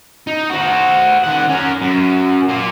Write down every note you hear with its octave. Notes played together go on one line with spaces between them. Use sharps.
D#4
F#4 C5
D#3 F#5
C#4 A#4
F#2
A#3 F4